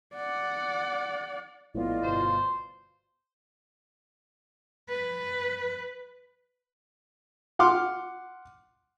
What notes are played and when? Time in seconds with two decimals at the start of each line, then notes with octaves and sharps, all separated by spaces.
0.14 D5 F#5
1.75 A#1 A2 B3 F4 D5 D#5
2.03 G1 B2 C5
4.89 B4
7.59 F#5 C6 D6 F6